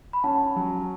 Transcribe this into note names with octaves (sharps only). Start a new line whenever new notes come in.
B5
C#4 F#5 A5
F#3